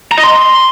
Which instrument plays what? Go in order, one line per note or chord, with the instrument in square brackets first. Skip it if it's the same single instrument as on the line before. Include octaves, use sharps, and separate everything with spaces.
[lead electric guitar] A#5
D#5
C6